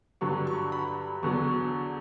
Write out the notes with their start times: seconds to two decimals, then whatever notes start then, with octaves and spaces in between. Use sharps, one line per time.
0.21 G2 D3 F#3 C#6
0.47 C#6
0.72 B5
1.23 E2 D3 F#3 C#6